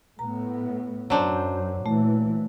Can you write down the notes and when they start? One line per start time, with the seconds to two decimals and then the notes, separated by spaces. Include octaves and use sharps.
0.19 A2 B3 A#5
1.10 F#2 F#3 D4 C5
1.86 A#2 E3 A3